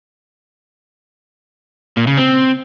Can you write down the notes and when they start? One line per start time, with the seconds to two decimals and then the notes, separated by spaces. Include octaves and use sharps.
1.97 A#2
2.07 C#3
2.17 C4